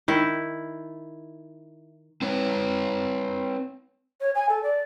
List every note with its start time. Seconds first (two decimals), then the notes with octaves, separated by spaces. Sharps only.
0.08 D#3 E4
2.22 C4 B4 C#5
4.21 C#5
4.35 G#5
4.49 A4
4.63 D5